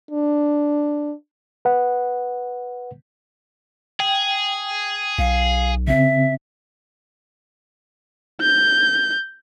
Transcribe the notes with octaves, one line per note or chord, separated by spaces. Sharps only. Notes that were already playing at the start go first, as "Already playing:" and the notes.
D4
B4 F#5
G#4 G5
B1 F5
C#3 C4 E5
G6